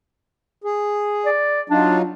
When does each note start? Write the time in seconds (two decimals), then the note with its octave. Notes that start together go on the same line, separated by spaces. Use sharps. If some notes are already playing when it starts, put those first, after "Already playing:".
0.64 G#4
1.26 D5
1.70 F#3 D4 D#4 F4